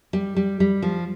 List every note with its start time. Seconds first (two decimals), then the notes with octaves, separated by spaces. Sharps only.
0.13 G3
0.36 G3
0.60 G3
0.82 F3